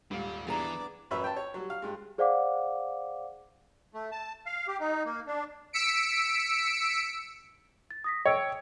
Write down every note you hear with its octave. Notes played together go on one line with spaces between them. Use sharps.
D#1 G#2 G3 F5
E3 B3 D4 G#4 A#5 D6
A1 F#2 C#4 B4 E5
G5 A5
C#5
F#3 G3
F5
G2 G#3
G#4 C5 D5 F5 F#5 D6
A3
A5
F5
G4
D#4
A#3
D4
E6 B6 C#7 D7
A6
D#6 A#6 B6
C#5 G5 E6 D7